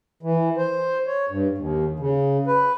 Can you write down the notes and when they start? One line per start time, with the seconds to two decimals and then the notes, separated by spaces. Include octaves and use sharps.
0.23 E3
0.57 C5
1.07 C#5
1.30 G2
1.58 D#2
2.00 C#3
2.47 B4